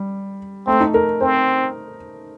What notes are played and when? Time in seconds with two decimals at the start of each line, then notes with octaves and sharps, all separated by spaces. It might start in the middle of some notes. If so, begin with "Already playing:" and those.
Already playing: G3
0.67 A3 C4
0.80 D#4
0.94 A#4
1.21 C4 C5